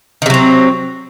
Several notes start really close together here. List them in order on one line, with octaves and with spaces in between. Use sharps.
D#3 C3 F#3 C4